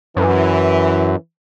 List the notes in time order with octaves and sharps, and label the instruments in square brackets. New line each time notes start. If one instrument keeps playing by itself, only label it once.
[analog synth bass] F#2 [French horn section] E3